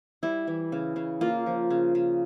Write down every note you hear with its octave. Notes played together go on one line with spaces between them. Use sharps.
G3 E4
E3
C#3
C#3
A#3 F4
F3
C#3
C#3